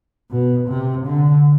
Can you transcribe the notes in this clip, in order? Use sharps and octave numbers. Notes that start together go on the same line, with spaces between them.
B2
C3
D3